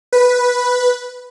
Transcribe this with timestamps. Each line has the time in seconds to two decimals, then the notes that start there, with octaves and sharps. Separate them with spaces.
0.13 B4